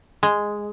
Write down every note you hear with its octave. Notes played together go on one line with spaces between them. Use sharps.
G#3